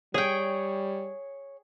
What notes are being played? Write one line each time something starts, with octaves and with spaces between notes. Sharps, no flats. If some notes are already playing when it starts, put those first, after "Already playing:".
G3 G#4 C#5 G5